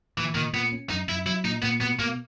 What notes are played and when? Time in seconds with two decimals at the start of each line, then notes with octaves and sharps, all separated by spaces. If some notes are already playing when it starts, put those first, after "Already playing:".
0.18 A#2 E3
0.35 A#2 D#3
0.53 A#2 B3
0.72 C#4
0.89 F#2 D#4
1.08 F#2 E4
1.26 F#3 E4
1.44 A#2 D#4
1.62 A#2 B3
1.81 B2 B3
1.99 B2 A#3